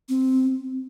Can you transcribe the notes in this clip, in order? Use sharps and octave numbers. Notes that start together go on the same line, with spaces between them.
C4